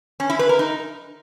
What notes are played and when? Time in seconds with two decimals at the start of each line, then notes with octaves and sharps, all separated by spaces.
0.20 C#4
0.30 E4
0.39 B4
0.49 A#4
0.59 D#4